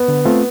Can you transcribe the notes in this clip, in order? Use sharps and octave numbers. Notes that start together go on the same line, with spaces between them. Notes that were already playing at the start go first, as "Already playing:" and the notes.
Already playing: B3
D3
A3 C4 F4